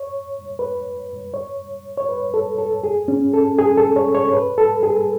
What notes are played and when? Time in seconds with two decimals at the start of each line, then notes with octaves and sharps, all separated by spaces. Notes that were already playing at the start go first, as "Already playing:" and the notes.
Already playing: C#5
0.59 B4
1.34 C#5
1.97 C#5
2.09 B4
2.34 A4
2.58 A4
2.84 G#4
3.08 C#4
3.33 A4
3.59 G#4
3.77 A4
3.96 C#5
4.15 C#5
4.33 B4
4.58 A4
4.83 G#4